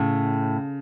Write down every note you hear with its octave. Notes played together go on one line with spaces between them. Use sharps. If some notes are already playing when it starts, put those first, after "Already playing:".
Already playing: A2 C#3